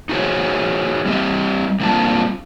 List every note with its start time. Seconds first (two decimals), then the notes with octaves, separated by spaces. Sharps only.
0.09 D#4 F#4 G#4 C5 C#5
1.06 G3 C4 G4 D#5
1.80 G3 A#3 C4 D4 F4 A5